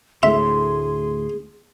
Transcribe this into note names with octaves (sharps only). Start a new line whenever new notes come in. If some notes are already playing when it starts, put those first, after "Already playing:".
D2 A2 G#4 E5 C6